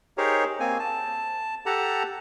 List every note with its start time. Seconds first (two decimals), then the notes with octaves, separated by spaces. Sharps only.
0.18 D#4 G4 G#4 A#4 C5 C#5
0.60 A#3 C4 G#5
0.79 A5
1.66 G4 A4 F#5 A5 A#5